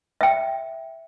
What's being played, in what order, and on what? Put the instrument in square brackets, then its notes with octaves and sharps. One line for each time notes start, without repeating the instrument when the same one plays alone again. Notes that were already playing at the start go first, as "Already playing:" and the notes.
[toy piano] E5 G5